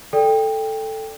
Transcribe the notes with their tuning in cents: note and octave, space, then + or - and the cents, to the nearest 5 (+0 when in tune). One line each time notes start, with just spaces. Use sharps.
A4 +0 D5 +0 G5 +15